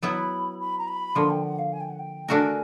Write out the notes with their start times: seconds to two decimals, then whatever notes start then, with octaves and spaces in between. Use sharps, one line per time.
0.03 F#3 B3 E4 B5
0.60 B5
0.78 A#5
0.88 B5
1.15 D3 F3 A#3 C6
1.30 G5
1.44 F#5
1.59 F5
1.73 G#5
1.81 G5
1.90 F#5
1.99 G5
2.28 A3 D4 F#4 A#4 G#5